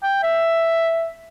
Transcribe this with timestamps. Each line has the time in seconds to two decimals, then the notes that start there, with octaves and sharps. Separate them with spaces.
0.03 G5
0.23 E5